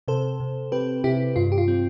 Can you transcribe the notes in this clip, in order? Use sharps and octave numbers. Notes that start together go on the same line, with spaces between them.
C3 A4 C5
C3
C4 G4 B4
C3 E4 G4
G2 F4
G4
F4
C4